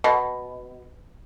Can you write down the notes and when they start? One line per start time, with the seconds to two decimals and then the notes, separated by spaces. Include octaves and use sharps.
0.04 B2